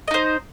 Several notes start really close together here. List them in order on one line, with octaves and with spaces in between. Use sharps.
D#5 D#4 C5